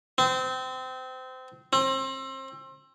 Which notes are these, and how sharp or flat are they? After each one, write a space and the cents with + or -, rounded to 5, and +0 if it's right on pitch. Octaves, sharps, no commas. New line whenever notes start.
C4 -25
C4 +30